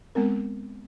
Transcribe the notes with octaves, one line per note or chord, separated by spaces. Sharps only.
G#3 B3 C4 A#4